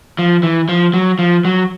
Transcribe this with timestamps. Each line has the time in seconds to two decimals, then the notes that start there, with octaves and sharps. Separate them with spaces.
0.19 F3
0.43 E3
0.69 F3
0.94 F#3
1.19 F3
1.45 F#3